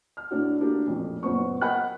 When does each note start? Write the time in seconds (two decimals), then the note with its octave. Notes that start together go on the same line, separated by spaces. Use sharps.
0.17 F6
0.31 A2 D4 F#4
0.60 A3 A#3 D4 F#4 G4
0.87 A1 F2 A#2 F3
1.23 F#1 A#2 B3 B4 C5 C#6
1.61 A#4 D#5 F#5 G5 B5 F#6